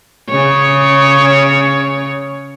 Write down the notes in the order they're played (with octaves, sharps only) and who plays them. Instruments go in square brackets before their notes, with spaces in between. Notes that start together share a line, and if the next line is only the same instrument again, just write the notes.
[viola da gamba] C#3 C#5